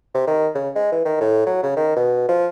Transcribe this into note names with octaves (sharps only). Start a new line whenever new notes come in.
C3
D#3
C#3
G#3
E3
D#3
A2
F#3
C#3
D#3
B2
F3